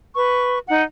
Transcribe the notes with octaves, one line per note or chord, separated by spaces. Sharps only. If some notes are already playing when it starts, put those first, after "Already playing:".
B4 C#6
D#4 F#5